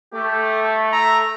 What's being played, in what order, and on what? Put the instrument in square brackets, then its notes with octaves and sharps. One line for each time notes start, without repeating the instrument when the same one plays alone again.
[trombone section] A3 [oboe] G4
[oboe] E5 [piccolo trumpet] A#5